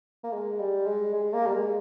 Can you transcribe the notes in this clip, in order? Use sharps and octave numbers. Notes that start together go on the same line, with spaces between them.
A#3
G#3
G3
G#3
G#3
A#3
G3
G#3